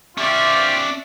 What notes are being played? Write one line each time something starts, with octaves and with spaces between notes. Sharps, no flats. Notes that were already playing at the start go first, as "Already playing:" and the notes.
C#4 F4 G4 D5 E5 C#6